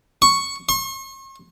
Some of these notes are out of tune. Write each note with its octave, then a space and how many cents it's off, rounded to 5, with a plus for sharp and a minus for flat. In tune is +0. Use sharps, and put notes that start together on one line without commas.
C#6 +0
C#6 -45